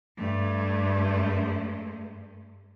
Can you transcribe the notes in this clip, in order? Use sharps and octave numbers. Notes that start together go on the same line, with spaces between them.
G2 A3